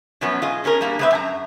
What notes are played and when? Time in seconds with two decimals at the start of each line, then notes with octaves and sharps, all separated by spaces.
0.21 F#2 B2 F3 F#3 B3 C#4
0.42 F4 G#4 D#5
0.64 B2 C#4 G#4 A#4
0.81 G3 A#3 D4 G#4
0.99 G#3 B3 C4 B4 C5 E5
1.11 F#2 G#5 A#5